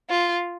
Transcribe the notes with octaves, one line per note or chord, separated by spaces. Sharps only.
F4